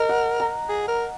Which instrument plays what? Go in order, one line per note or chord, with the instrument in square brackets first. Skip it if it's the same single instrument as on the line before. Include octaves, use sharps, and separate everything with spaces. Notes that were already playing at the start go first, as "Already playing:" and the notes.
Already playing: [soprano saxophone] A#4 [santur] D#5
[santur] F#5
A#5
[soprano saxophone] G#4
A#4